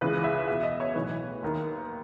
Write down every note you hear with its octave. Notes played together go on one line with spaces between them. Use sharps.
C#2 C#3 E3 B4
E5
E2 B2 E5
D#5
C#5
B1 A2 E3 B4
D#2 D#3